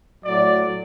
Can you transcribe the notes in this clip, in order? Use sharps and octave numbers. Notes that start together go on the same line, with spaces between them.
A2 F#3 D5